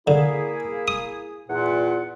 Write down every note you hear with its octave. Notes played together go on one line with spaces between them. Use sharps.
D3 A#3 E4 G#4
D#6
E2 A#2 F#5